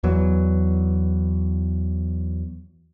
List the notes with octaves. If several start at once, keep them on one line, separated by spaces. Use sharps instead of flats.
E2 E3 F#3